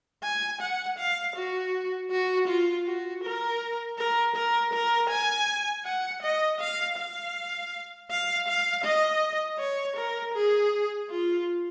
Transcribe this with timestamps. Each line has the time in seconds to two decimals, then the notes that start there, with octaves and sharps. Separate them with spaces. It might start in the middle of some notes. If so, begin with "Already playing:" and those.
0.23 G#5
0.61 F#5
0.98 F5
1.36 F#4
2.11 F#4
2.48 F4
2.86 F#4
3.23 A#4
3.98 A#4
4.36 A#4
4.73 A#4
5.10 G#5
5.85 F#5
6.22 D#5
6.61 F5
6.98 F5
8.11 F5
8.48 F5
8.84 D#5
9.59 C#5
9.97 A#4
10.34 G#4
11.10 F4